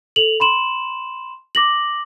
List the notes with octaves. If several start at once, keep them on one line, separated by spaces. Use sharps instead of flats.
A4 F7 F#7
B5 C6 E7 F#7
D6 A#6 F#7